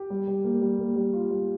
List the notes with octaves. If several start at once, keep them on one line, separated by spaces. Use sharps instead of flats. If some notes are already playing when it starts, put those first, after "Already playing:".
Already playing: G4
G3
G3
A#3
G3
A#3
G3
F4
G3